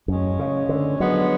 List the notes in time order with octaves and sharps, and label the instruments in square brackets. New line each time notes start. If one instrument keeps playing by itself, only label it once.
[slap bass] F#2 [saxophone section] A2 G#3 C#4
[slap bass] C#3
D3
[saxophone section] D3 F3 G#3 B3 D4 [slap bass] F#3